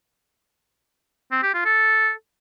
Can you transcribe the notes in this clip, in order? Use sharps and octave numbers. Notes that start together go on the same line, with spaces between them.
C4
G4
F4
A4